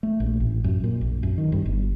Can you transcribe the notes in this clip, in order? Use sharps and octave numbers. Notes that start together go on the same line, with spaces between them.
A3
A#1
A1
F#2
A#2
A#1
F#2
D#3
G2
G1